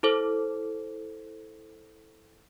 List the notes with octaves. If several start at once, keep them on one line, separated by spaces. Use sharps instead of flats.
E4 A4 C5